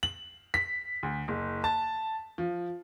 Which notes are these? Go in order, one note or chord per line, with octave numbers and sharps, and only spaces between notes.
F#7
B6
D2
F#1
A5
F3